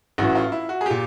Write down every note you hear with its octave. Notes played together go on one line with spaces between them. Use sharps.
A1 A2 E3 F#4
F4
E4
F#4
G#4
A#2 G4